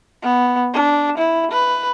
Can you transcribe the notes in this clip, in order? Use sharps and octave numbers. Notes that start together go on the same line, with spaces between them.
B3
D4
E4
B4